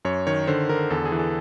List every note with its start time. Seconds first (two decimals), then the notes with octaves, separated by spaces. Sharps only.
0.05 F#2 C#5
0.27 D#3 C#5
0.47 D3 C5
0.69 D3 A#4
0.90 E2 A4
1.05 G#4
1.12 E3
1.19 A4